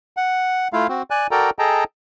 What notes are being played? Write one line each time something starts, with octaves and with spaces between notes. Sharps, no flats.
F#5
A3 E4 F4 F5
C4 F#4
D5 G#5 F#6
F#4 A4 A#4 D5 G5 A#5
G#4 A4 D#5 G5 A5 A#5